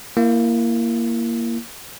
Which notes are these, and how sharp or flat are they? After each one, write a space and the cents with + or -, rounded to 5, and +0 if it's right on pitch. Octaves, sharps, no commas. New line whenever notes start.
A#3 +0 E4 +30